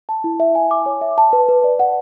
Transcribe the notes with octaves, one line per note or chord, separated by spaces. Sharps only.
A5
E4
E5
G#5
D6
C#5
E5
A5
B4
B4
D5
F#5